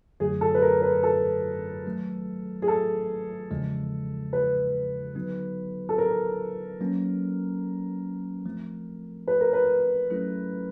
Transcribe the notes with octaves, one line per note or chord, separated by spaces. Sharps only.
F#2 D3 F#3 A3 G#4
A4
B4
A#4
B4
A4
D#3 F#3 A3
G#4
A4
E2 C#3 F3 G#3
B4
D3 F#3 B3 D#4 F#4
A4
A#4
F#3 A#3 C#4
F3 A3 C4
B4
A#4
B4
F#3 A3 C#4 E4 A4